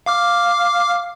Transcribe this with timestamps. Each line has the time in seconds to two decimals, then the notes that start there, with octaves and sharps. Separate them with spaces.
0.06 F5 D6 F6